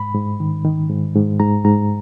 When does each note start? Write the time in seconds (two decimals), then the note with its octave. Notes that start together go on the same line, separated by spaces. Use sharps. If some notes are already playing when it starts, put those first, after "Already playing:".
Already playing: G#2 B5
0.14 G#2
0.40 D#3
0.65 D#3
0.90 G#2
1.15 G#2
1.40 G#2 A#5
1.65 G#2 A#5